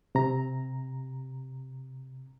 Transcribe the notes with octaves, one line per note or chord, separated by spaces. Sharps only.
C3 A#5